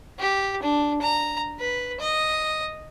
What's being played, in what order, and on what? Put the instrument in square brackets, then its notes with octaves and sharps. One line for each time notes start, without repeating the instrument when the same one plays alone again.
[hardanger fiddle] G4
D4
A#5
B4
D#5